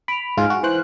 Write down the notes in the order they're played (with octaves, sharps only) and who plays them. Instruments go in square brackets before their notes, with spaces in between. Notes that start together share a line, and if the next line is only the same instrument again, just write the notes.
[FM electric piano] B5 [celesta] D7 F7
[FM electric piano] G#2 F4 [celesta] G#5 F6
[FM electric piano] F#4
E3 C5 F#6